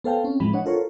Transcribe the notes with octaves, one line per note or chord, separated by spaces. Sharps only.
B3 A4 C5 F5 G5 A5
C4 C#4
A2 E3 F3 G#3 B5
D4 C#5 D#5 F#5
F4 A4 A#4 C5 C#5